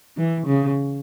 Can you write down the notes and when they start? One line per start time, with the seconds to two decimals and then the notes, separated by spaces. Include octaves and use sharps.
0.17 E3
0.46 C#3